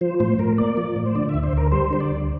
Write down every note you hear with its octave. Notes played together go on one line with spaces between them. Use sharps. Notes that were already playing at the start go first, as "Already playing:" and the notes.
F3 C5
A2 C5
A2 A#4
A#3 D5
F3
A2
C5
D3 D5
E5
D2
C5
D2 A#4
G3 C5
D3 C5
D5
D2